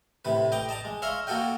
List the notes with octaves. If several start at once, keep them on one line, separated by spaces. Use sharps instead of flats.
A2 C3 B4
D#5 G5 A#5 D6
D#5 A5 A#5 D6
G#3
C#5 E5 F5 A#5 C6
A#3 F#4 A4 D#5 G5